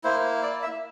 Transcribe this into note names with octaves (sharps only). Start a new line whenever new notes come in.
A#3 E4 C5
D5
E5